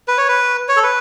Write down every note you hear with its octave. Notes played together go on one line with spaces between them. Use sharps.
B4
C#5
B4
C#5
A4
B4